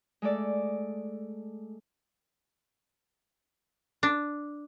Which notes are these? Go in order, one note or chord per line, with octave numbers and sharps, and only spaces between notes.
G#3 A3 A4 D5
D4